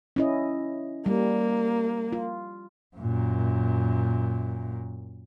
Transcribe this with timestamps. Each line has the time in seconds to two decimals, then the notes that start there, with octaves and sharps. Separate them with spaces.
0.16 C#4 E4 D#5
1.06 G3 A#3
2.13 F4
2.97 F#2 A#2